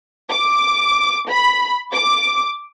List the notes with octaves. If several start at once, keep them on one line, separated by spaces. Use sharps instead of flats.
D6
B5
D6